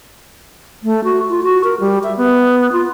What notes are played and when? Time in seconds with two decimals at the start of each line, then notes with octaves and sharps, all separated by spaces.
0.83 A3
1.04 F#4
1.29 F4
1.43 F#4
1.64 A#4
1.80 G3
2.03 E5
2.17 B3
2.72 F4